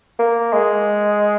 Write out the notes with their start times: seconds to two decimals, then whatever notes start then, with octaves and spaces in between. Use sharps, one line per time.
0.19 A#3
0.53 G#3